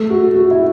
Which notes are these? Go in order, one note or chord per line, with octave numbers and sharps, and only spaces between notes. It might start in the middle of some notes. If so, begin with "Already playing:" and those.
Already playing: A3
F#4
F#4
E4